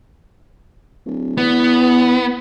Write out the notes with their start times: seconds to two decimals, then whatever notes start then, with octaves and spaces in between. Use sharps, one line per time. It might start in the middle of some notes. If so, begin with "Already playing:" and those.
1.06 D1
1.37 E2 B3